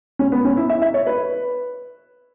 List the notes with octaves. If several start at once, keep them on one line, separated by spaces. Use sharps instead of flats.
C#4
B3
C#4
E4
E5
E5
C#5
B4